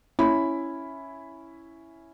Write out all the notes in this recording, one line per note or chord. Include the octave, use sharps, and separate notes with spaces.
C#4 E4 B5